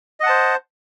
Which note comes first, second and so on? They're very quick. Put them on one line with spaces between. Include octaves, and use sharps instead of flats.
D#5 F#5 A5 C5